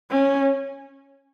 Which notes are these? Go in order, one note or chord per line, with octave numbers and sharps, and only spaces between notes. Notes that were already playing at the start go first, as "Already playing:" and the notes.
C#4